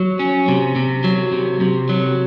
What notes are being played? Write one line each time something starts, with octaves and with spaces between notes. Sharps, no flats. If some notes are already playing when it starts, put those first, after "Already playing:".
Already playing: F#3
C#4
C3
C3
F#3
C3
C3
F#3